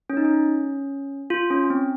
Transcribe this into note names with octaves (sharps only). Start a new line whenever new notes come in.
C#4
D#4
C#4
F4
C#4
C4